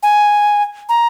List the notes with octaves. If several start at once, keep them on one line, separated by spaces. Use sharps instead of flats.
G#5
A#5